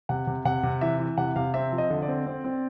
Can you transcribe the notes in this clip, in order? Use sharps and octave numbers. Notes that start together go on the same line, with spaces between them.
C3 F#5
C3
C3 F#5
C3
E3 E5
E3
C3 F#5
C3 F5
C4 E5
F3
D#5
D3
D5
C4
C4
C4